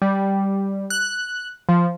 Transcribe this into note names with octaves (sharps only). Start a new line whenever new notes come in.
G3
F#6
F3